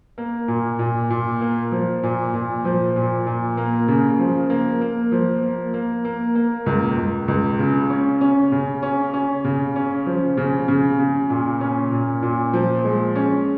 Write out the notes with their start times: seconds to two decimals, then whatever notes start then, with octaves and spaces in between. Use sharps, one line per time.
0.18 A#3
0.48 A#2
0.79 A#2
1.10 A#2
1.41 A#3
1.72 F3
2.03 A#2
2.34 A#2
2.65 F3
2.96 A#2
3.27 A#2
3.57 A#3
3.88 C#3
4.19 F3
4.50 A#3
4.81 A#3
5.12 F3
5.43 A#3
5.74 A#3
6.05 A#3
6.35 A#3
6.66 C#2
6.97 C#2
7.28 C#2
7.59 C#3
7.90 C#4
8.21 C#4
8.52 C#3
8.83 C#4
9.14 C#4
9.44 C#3
9.76 C#4
10.07 F3
10.37 C#3
10.68 C#3
10.99 C#3
11.30 A#2
11.61 C#4
11.92 A#2
12.23 A#2
12.53 F3
12.85 G#3
13.16 C#4